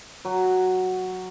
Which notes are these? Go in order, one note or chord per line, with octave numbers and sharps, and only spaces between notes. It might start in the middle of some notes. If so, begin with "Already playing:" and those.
F#3